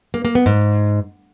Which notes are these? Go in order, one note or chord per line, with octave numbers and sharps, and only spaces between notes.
A#3
A#3
B3
G#2